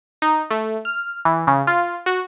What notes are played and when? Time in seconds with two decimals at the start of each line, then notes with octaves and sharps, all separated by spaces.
0.22 D#4
0.51 A3
0.85 F6
1.25 E3
1.47 C#3
1.67 F4
2.06 F#4